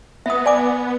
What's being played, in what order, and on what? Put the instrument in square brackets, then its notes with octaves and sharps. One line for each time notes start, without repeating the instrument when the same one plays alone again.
[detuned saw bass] B3 [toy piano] E5 D#6
[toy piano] D5 G#5 D6